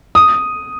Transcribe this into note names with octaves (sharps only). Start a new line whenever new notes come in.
D#6